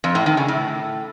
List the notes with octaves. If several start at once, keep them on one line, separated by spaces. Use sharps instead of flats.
F2
A2
D#3
C#3
A2